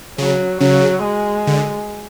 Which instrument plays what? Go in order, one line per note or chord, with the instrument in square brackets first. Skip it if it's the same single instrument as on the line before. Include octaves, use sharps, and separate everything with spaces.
[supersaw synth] C#3 [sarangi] F#3
[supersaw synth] C#3 [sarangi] F#3
[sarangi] G#3
[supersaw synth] D3